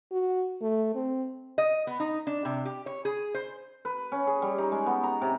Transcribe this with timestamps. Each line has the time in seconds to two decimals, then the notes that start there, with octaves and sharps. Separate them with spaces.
0.12 F#4
0.62 A3
0.95 C4
1.58 D#5
1.87 B3
2.00 D#4
2.27 D4
2.45 C3
2.65 G4
2.86 C#5
3.05 G#4
3.34 C5
3.85 B4
4.12 C#4
4.27 G#4
4.42 G3
4.58 D#4
4.72 G#3
4.86 B3
5.03 A#5
5.22 C3